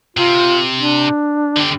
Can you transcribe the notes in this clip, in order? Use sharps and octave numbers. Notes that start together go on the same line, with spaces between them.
C3 F4
D4
D3 G4